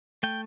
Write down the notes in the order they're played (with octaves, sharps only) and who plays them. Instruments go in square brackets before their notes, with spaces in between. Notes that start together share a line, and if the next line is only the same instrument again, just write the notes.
[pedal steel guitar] A3 G5